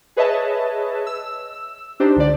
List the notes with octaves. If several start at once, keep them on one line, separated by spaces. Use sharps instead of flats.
G#4 B4 C#5 D#5 E5 A5
E6
D4 D#4 G4 C5
C#2 D3 D5